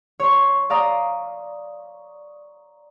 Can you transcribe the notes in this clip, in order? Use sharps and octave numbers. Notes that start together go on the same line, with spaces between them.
C#5 C6
D5 F5 A#5 D#6